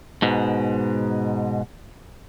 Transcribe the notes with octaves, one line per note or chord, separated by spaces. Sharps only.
G#2 B2